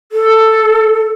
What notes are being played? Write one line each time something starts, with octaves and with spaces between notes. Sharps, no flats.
A4